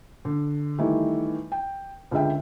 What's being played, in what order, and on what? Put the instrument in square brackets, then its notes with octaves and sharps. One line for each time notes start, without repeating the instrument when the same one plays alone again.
[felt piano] D3
D#3 E3 G3 A3
G5
C#2 D3 G#3 E5 G5